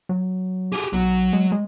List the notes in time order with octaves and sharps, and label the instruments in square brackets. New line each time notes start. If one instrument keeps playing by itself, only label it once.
[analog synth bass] F#3
[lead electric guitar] G4 G#4
[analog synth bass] B1 [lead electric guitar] F#3
[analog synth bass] G#3
G#3